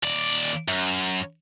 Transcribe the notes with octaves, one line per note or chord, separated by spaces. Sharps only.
D#2 D5
F#2